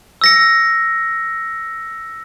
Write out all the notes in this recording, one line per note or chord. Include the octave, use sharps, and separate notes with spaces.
E6 A#6 C#7